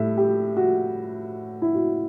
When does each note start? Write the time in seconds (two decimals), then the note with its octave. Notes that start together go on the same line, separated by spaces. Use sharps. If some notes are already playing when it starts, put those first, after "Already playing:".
Already playing: A2 G3 E5
0.18 G4
0.57 F#4
1.62 E4
1.75 F#4